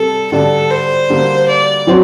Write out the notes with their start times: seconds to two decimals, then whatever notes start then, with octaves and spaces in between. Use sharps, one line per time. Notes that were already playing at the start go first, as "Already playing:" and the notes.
Already playing: C3 G3 A4
0.32 D3 G3 D4 A4
0.71 C5
1.10 D3 G3 A#3
1.48 D5
1.87 F#3 C4 F#4 C5